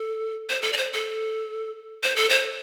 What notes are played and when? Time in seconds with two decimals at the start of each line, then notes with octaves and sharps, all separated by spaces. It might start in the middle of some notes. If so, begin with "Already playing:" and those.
Already playing: A4
0.49 C5
0.62 A4
0.73 D5
0.77 C5
0.93 A4
2.03 C5
2.16 A4
2.29 C5